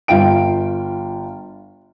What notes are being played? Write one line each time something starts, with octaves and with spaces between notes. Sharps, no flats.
G1 F4 F5 G5 D7